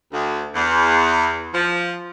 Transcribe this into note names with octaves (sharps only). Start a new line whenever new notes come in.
D2
E2
F3